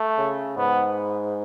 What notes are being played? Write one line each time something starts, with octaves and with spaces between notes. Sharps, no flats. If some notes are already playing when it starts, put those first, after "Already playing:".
Already playing: A3
C#3
G#2 B3